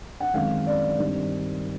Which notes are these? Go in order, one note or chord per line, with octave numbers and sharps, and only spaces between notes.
F#5
F#2 D#3 G#3 C4 F5
D5
G2 D#3 G3 C4